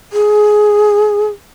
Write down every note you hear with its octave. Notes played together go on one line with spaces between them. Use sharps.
G#4